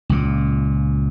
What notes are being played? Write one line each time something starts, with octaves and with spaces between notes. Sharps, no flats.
C#2 A#2